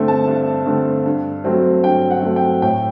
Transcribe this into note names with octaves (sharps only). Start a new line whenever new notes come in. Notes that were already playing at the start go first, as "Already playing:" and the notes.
Already playing: G2 D3 A3 C4
A5
G2
D3 A3 C4
G2
F#3 A3 C4
G2 G5
F#5
F#3 A3 C4
G5
A2 G5